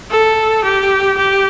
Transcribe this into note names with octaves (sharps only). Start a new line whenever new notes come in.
A4
G4
G4